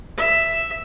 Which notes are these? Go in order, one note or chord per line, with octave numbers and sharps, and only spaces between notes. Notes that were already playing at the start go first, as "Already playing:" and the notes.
E5